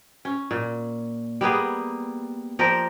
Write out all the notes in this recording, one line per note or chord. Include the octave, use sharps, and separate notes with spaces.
C#4
A#2
G3 A#3 B3 G#4
F3 G4 A#4 D5